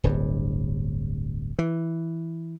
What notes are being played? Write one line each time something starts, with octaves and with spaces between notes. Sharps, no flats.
D1 G1 G2
E3